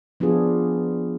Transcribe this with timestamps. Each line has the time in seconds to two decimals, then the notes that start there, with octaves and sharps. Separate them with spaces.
0.20 F3 B3 D4 F4 G#4